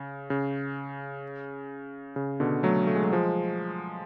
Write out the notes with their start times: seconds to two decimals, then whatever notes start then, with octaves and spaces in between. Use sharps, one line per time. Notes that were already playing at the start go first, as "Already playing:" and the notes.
Already playing: C#3
0.30 C#3
2.16 C#3
2.40 B2 D3
2.63 F#3 A3
2.87 A3
2.95 G#3
3.04 F#3
3.13 F3 G#3